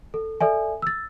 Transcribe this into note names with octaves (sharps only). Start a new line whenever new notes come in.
A4
A4 D5 E5 G#5
E6 A6